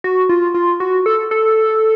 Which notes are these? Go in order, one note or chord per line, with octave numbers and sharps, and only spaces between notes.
F#4
F4
F4
F#4
A4
A4